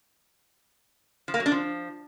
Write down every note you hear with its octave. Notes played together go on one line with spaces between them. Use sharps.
F3
A#3
F#3
D4
F3